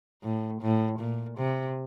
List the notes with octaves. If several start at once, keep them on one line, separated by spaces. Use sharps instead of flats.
A2
A2
A#2
C3